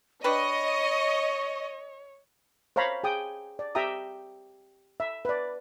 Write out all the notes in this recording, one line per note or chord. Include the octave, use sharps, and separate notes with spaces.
D4 G4 B4 C#5 D#5 C#6
C5 C#5 F5 A#5 B5
G#4 G5 D#6
D5
G4 E5 G5 A#5 D#6
E5
B4 D5